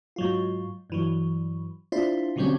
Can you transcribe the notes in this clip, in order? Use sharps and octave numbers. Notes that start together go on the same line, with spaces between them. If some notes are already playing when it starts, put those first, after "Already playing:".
G#2 F#3 F4
G2 E3 F#3
D4 E4 F4 C5
B2 D3 F#3 G3 C4 C#4